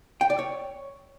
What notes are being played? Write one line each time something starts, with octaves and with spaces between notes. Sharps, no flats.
G5
D5
C#5